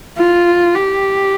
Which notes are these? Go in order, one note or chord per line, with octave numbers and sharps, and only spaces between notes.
F4
G4